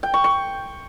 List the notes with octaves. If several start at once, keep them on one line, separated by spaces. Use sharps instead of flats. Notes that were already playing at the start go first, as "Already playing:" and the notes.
G5
C#6
C#6